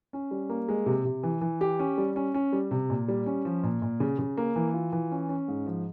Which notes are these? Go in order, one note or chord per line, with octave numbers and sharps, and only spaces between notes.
C#4
G3
A#3
G#3
C3
C3
E3
E3
G4
C#4
G3
C#4
C#4
G3
C3
A#2
G3
C#4
F3
A#2
A#2
C#3
C#3
A#3
E3
F4
E3
C#4
C#4
G#2
F3